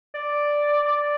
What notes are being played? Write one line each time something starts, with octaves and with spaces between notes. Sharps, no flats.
D5
D5